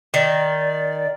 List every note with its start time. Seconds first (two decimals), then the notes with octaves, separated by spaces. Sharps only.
0.14 D#3 D5